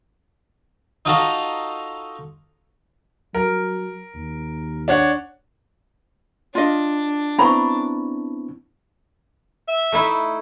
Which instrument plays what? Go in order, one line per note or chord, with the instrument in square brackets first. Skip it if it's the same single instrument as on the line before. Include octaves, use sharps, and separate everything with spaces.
[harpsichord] D#4 F4 F#4 A4 F5 A#5
[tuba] F#3 [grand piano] A#4
[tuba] D#2
[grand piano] D4 C#5 F#5
[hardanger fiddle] D4 [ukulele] F4 D#5
[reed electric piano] B3 C4 E4 [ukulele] A#5 [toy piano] B5 C#6
[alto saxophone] E5
[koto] A3 D#4 E4